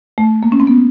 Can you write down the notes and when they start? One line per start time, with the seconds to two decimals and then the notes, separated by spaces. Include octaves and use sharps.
0.18 A3
0.43 A#3
0.52 C#4
0.60 C4
0.67 B3